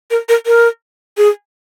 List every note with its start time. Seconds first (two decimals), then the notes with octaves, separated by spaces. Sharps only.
0.11 A#4
0.29 A#4
0.46 A#4
1.17 G#4